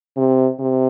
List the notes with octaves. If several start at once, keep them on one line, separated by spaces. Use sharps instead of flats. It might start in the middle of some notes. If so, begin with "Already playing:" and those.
C3
C3